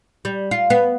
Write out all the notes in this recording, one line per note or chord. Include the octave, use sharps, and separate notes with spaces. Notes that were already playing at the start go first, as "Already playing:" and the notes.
G3
F4
B3